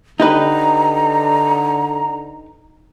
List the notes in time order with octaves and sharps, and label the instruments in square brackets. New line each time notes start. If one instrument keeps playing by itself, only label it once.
[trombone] D3 [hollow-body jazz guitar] D#4 G4 B4 [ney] A#5